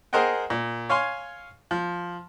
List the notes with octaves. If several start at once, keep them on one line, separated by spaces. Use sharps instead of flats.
G#4 A#4 C5 D#5 F#5 G5
A#2
C#5 F5 G#5 C6
F3